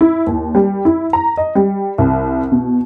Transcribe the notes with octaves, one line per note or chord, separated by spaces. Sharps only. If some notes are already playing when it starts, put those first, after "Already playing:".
E4
D#2
G3
E4
A#5
D#5
G3
C2
B2